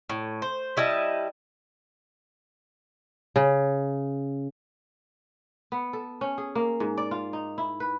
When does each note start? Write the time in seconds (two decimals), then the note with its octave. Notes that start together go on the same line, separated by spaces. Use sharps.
0.09 A2
0.42 C5
0.77 G3 E4 D#5 A5
3.36 C#3
5.72 B3
5.93 A4
6.21 C#4
6.38 G#4
6.55 A#3
6.80 G#2
6.98 D5
7.11 F4
7.33 D#4
7.58 E4
7.80 B4